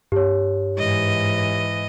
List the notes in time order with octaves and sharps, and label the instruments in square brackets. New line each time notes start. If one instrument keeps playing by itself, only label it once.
[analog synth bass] G2 [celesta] G4 C#5
[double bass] G#2 E3 [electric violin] D#5